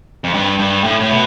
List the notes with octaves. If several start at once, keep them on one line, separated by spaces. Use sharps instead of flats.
F2
G2
G2
A2
A2
B2